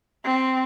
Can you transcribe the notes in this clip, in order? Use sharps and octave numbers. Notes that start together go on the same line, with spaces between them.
C4